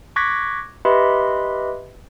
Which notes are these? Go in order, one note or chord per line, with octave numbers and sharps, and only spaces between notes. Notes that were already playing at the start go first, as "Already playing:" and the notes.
C#6 D6 F#6 G#6 A#6 B6
G4 B4 D#5 E5 B5 C6